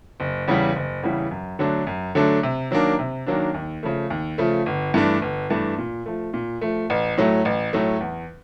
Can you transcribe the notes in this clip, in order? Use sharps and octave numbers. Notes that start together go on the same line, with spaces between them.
F#1
E2 C#3 E3 G3
F#1
E2 C#3 E3 G3
F#2
D3 F#3 A3 D4
F#2
D3 F#3 A3 D4
C3
D#3 F#3 A#3 D4
C3
D#3 F#3 A#3 D4
D#2
C#3 F3 A3
D#2
C#3 F3 A3
G1
G2 E3 A3 D4
G1
G2 E3 A3 D4
A#2
F3 A3
A#2
F3 A3
A1
A2 F#3 A3
A1
A2 F#3 A3
E2